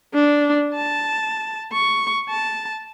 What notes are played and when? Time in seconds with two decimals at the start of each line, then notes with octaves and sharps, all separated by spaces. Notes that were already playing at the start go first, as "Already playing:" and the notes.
0.14 D4
0.75 A5
1.73 C#6
2.30 A5